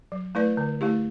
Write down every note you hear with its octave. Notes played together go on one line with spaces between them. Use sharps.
F#3
A3 E4 B4 D5
D3
A3 E4 G4